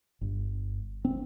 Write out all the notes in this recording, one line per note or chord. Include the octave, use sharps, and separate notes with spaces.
G1
C4